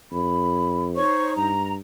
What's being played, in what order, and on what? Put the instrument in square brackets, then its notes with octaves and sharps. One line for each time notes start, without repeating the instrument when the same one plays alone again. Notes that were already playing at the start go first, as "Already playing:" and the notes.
[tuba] F2 [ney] B5
[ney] D#4 [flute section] C5 C#5 C#6
[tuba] G2 [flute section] A#5